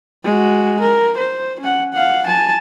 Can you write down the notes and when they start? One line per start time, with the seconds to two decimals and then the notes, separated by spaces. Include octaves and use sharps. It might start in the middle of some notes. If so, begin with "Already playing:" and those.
0.24 G#3 F#4
0.80 A#4
1.17 C5
1.60 C#4 F#5
1.93 F5 F#5
2.27 G#5 A5